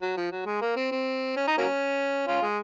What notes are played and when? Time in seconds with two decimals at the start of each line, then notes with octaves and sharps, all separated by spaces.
0.02 F#3
0.17 F3
0.31 F#3
0.46 G#3
0.61 A#3
0.76 C4
0.92 C4
1.36 C#4
1.47 D#4
1.58 F#3 A#3 C#4
2.27 C#4 F4
2.42 G#3